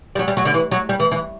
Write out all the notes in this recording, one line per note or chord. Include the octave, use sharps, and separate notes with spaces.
G3
F#3
G3
F#3
D3
E3
F#3
G3
E3
E3